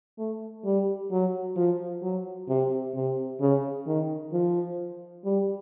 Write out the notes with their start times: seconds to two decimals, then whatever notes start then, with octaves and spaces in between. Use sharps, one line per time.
0.18 A3
0.65 G3
1.11 F#3
1.56 F3
2.02 F#3
2.49 C3
2.95 C3
3.41 C#3
3.87 D#3
4.33 F3
5.25 G3